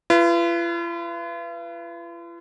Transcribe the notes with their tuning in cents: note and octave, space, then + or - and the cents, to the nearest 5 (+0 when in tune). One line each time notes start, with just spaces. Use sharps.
F4 -45 B4 +0